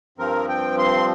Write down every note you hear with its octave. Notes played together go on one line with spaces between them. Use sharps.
G2 F3 C4 A#4
G5
C6